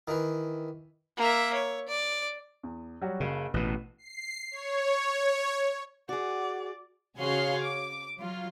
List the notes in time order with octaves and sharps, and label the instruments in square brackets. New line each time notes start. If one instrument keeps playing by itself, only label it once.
[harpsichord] D#3 E3
[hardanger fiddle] A#3 E5
C#5
D5
[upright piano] E2
F#3 G3 F#4
[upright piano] F#1 [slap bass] C#3
[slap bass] A1 B2 [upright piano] B4
[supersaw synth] C7
C#5
[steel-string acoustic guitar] F#4 G#4 [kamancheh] D5 [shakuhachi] F#5
[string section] C#3 F#4 G#4 C#5 F5 C6
D6
F#3 F4